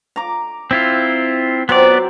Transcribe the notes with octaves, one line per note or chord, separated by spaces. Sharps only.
A#5 D6
C4 E4 F4
F#3 B3 C4 D5